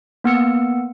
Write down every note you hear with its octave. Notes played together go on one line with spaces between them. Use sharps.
A#3 B3 E6 C#7